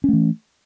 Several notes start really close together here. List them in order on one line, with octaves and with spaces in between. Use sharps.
C#4 A3 E3